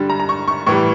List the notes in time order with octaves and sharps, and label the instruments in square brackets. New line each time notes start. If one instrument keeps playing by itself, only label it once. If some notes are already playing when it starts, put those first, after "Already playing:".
Already playing: [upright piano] G2 D3 G3
A#5
A#5
C#6
C#6
A2 E3 G3 C#6